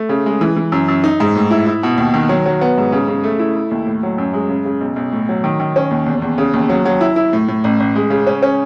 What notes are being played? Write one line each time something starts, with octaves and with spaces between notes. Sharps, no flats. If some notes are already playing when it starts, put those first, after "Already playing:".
Already playing: A3
C#3
G#3
E3
E3
F#2
F#2
D#4
G#2
A2
E4
E4
B2
D#2
D#3
F#3
F#3
B3
G#2
C#3
C#3
A3
E4
A3
D#2
A2
F#3
F#2
G#3
C#3
C#3
B1
B1
A2
F#3
D#3
D#3
C#4
D#2
E2
E2
C#3
D#2
F#3
F#3
E4
E4
A2
A2
A1
A1
G#3
C#3
C#4
C#4